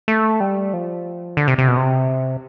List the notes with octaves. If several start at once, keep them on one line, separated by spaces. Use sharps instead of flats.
A3
G3
F3
D3
C3
C3
B2
C3